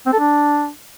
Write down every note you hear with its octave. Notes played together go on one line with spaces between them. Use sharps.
C4
A4
D4